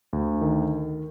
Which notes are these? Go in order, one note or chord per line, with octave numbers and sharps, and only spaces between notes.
D2
D#3